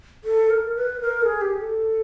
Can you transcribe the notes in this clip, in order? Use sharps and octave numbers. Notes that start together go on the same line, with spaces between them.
A4
A#4
B4
A#4
A4
G#4
G4
A4